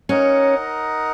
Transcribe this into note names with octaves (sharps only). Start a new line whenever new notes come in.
C#4 D#4 A#4 D#5 F#5